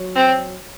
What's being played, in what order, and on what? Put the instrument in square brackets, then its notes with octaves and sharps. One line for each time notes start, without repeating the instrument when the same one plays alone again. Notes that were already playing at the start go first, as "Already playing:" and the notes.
Already playing: [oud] F#3
[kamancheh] C4